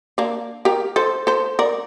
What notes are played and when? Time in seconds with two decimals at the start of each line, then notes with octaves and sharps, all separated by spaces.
0.18 A#3 D4
0.65 G4 A#4
0.96 A4 C5
1.27 A4 C5
1.59 A#4 D5